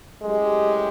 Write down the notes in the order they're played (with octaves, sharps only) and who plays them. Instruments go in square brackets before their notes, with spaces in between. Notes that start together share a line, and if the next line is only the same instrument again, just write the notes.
[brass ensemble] F#3 A3 C#4 E4 G4 [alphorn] G#3